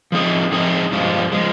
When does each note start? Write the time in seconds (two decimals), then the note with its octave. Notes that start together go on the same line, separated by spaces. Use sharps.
0.12 F3 C4 D#4 G#4
0.52 F3 C4 D#4 G#4
0.92 G2 F3 G#3
1.32 F3 G#3